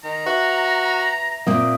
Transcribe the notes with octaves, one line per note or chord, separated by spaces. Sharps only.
D#3 A#5
F#4 B4 E5
A#2 A#3 C4 E5 F5 D#6